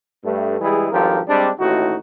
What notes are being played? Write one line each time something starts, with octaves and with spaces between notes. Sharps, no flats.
G2 A3
E3 G3 G#3 E4 G#4
G#1 G2 F3 G4 A4 A#4
G3 G#3 C4 D4
A1 D#2 A2 D#4 F#4